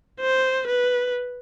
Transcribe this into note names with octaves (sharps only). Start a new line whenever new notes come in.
C5
B4